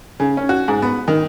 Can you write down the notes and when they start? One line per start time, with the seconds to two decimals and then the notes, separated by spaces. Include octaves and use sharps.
0.20 C#3
0.37 C#4
0.49 F#4
0.68 G#2
0.82 B3
1.08 D#3